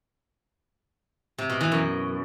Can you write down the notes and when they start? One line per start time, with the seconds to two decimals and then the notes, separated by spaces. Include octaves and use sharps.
1.38 C3
1.49 B2
1.61 E3
1.72 F#2